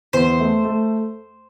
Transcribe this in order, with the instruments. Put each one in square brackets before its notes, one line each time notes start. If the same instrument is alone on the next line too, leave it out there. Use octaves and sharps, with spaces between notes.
[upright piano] E2 [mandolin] C5
[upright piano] A3
A3